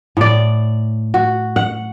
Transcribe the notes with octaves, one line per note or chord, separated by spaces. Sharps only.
A2 D5
F#4
F#5